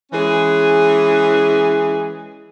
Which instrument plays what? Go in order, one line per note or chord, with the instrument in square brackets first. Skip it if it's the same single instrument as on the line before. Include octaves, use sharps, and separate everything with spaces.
[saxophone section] E3 G#3 C#4 G#4